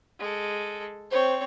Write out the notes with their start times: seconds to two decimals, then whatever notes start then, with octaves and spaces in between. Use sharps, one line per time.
0.19 G#3 A4
1.11 C4 C5 C#5